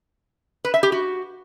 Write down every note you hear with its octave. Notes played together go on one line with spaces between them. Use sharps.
B4
E5
G4
F#4